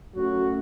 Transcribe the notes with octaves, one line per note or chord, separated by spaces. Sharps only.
F#2 F#3 A3 F#4